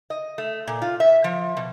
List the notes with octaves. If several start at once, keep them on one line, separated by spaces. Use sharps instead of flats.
D#5
A3
A#2
F4
E5
F3
B2